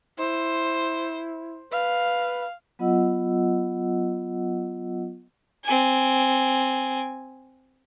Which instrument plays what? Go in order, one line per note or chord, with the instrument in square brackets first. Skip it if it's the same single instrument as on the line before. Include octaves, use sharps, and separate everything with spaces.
[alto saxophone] E4 [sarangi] C5
[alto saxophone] B4 [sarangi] F5
[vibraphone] F#3 B3 F4 D#5 F#5 E6
[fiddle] C4 G#5